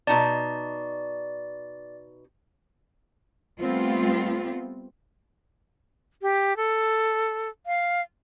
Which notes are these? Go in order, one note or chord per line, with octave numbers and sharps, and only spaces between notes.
B2 D#4 D5 A5
G3 A3 B3 C4 F4
G4
A4
F5